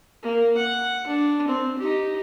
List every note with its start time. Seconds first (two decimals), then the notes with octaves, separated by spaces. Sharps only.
0.23 A#3
0.57 F#5
1.07 D4
1.48 C4
1.78 D#4 G4